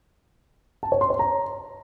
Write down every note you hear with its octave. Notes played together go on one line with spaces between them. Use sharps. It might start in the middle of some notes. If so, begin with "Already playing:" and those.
A5
C#5
C6
C#5
A#5